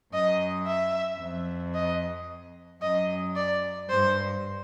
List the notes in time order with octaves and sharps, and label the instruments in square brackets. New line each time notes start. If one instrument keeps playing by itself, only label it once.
[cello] F#2 [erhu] D#5
[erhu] E5
[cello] F2
[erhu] D#5
[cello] F#2 [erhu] D#5
[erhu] D5
[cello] G2 [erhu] C5